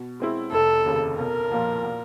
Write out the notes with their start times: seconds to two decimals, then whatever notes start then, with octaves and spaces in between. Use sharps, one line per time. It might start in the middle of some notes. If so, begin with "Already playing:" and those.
Already playing: B2
0.20 G#3 C4 E4
0.52 F1 A4
0.86 D#2 C#3
1.18 B1 A#4
1.51 A#2 F3 A#3
1.85 A#2